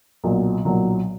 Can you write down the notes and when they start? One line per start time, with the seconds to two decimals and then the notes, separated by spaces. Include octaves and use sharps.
0.24 B1 A#2 F#3
0.65 B1 A#2 F#3